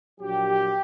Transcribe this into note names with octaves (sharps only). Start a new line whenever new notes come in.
A#1 A#2 F#3 G4